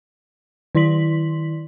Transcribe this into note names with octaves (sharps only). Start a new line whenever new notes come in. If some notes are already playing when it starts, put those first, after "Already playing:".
D#3 E4 D5 C6 B6 F#7